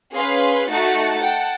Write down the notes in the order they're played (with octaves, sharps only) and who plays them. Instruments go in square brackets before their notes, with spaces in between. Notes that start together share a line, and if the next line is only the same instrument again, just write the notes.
[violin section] C#4 G#4 B4 F5 C6
A3 D#4 F#4 F#5 A5 A6
F#5 G5 A5